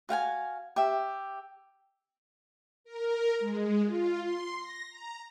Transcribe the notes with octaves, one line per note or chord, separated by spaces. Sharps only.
F#4 F5 G5 G#5
G4 E5
A#4
G#3
F4
C6
A#6
A#5